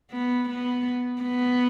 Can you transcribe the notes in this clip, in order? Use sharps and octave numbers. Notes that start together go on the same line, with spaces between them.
B3
B3
B3